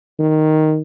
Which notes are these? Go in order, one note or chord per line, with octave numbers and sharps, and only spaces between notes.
D#3